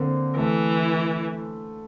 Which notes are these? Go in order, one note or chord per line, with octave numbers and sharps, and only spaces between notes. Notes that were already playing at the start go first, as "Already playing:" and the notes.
Already playing: D3 A#3 C4
E3 A3